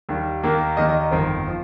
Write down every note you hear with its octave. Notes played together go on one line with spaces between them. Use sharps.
D#2 D#3 G3
D#2 D#3 A#3
D#2 D#3 A#3 D#5
D#5
D#5
G1 F2 D#3 C5
F3